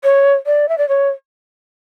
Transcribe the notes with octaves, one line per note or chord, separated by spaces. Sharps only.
C#5
D5
E5
D5
C#5